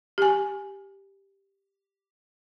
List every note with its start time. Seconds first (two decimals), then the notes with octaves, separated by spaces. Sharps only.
0.18 G4 G#5